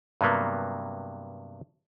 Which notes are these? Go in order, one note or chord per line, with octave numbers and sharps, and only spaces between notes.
G2 C3 F#3 A#3 B3